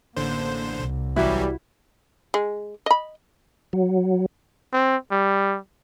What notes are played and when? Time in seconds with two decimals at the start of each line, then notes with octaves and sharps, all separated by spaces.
0.16 A1 D3 A#3 C5
0.77 C2
1.16 A1 E3 F#3 G3 E4 F#4
2.34 G#3
2.86 D#5 B5
3.73 F#3
4.73 C4
5.11 G3